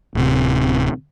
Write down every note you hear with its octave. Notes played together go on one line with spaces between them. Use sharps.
D1 C3